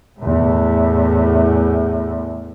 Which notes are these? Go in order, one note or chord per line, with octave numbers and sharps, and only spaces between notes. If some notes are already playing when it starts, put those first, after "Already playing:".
E2 A2